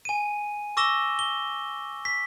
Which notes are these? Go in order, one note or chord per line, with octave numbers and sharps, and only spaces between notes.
G#5 D#7
C#6 D6 E6 A#6 E7 G7
G7
B6